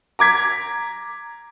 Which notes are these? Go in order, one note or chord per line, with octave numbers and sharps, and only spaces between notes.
A#5 D6 G#6 B6